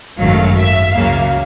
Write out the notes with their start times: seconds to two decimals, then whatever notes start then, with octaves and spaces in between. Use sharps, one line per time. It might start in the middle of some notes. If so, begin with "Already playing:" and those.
0.20 G#1 F#2 D#3 F#3 A3 F5
0.57 E5
0.92 C#2 C#3 F#3 A#3 F5